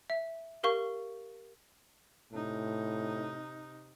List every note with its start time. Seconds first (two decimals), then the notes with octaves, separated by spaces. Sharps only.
0.10 E5
0.63 G4 A#4 F5 C#6
2.33 A2 C3 D#4